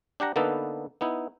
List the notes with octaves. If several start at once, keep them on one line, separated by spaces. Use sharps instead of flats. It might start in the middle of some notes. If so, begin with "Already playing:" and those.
D4 G4 F#5 A#5
D3 A#3 B3 D#4 A4 B4
B3 D#4 E4